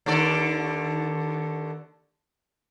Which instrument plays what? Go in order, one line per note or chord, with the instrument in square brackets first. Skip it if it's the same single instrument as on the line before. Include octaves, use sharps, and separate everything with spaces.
[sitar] D#2 D3 D5